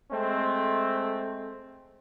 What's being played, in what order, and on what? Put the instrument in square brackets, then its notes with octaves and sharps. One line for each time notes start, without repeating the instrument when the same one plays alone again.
[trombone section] G#3 A3 C4